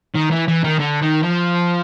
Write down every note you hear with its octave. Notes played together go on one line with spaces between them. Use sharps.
D#3
E3
E3
D#3
D3
D#3
F3